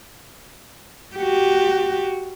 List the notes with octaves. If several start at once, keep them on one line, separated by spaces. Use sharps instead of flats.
F#4 G4